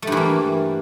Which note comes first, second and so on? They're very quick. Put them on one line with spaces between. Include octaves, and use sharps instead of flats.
A3 G2 E3 A#3